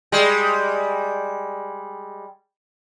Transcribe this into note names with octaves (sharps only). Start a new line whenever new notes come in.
G3 G#3